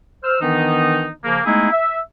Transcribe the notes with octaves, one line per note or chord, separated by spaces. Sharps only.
C5 E6 F6
D#3 E3 B3 D4 D#4
C#3 F3 A#3
G#3 A3 B3 D#4 E4 G#4
E5